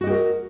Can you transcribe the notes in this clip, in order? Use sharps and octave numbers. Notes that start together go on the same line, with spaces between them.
F#4 G4 A#4 D#5